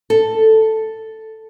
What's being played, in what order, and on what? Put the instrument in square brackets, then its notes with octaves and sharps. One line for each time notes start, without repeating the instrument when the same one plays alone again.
[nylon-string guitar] A4